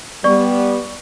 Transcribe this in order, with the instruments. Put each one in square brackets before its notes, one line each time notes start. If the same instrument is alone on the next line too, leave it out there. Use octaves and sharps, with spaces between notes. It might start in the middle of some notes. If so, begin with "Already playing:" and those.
[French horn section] G3 B3 [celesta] D5 C#6